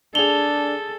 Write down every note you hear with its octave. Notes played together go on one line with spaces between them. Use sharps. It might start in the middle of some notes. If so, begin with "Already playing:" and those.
D4 G#4 A4 F7 G7